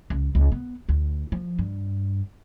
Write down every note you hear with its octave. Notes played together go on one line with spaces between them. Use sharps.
C#2
C#2
B3
D2
F3
G2